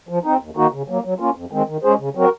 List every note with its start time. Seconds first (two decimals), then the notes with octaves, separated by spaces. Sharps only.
0.09 F3
0.24 C4 D#4
0.40 D#2
0.56 D#3 A#3 D#4 F#4
0.72 C#3
0.88 F#3 A#3
1.04 F#3
1.19 A#3 C#4 F4
1.35 F2
1.51 D#3 G#3 C4
1.67 D#3
1.84 G#3 C#4 G#4 C5
1.99 C#3
2.15 F#3 C4 F#4 A#4